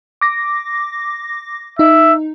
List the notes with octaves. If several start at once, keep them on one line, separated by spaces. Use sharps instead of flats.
D6 A#6
D#4 E5